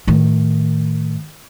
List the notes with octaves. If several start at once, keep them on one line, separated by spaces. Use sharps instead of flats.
A2 D#3